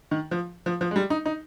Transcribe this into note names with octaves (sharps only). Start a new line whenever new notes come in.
D#3
F3
F3
F3
G#3
G3
D#4
D#4